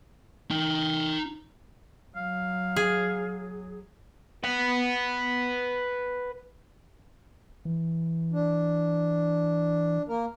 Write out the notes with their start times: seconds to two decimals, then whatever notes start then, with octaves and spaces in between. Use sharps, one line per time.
0.50 D#4 G5
2.16 F#3 F5
2.76 G#4
4.44 B4 F#5
7.65 E3
8.32 D4
10.09 A#3 A#4